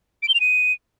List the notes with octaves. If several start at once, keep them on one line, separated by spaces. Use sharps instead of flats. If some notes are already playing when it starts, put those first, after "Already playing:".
D7
G7
F7
D#7